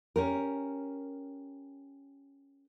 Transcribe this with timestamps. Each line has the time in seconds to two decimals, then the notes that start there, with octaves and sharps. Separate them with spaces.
0.16 C#4 G4 A#4